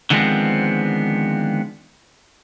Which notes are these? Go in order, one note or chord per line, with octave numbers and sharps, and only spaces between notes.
D3 D#3 F3 G#3 B3 C4